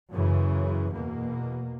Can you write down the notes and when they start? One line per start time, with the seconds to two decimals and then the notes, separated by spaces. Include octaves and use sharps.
0.12 F#2 C#3 E3
0.91 E2 B2 A#3